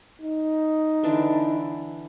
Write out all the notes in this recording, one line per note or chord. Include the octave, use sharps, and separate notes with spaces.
D#4
D3 E3 D4